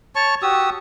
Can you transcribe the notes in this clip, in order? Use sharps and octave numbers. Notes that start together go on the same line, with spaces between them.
C#5 A5 C#6
F#4 G4 D#6 E6